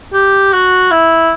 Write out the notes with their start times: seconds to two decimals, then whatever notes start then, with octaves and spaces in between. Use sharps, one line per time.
0.13 G4
0.53 F#4
0.91 E4